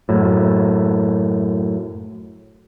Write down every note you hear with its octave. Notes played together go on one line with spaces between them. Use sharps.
F#2 A2